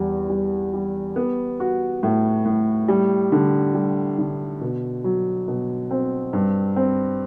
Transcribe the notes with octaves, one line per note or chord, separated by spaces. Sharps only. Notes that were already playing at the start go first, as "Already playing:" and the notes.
Already playing: E2 G3
G3
G3
B3
F#4
A2
A2
G3
D3
G3
D3
B2
F#3
B2
C4
G2
C4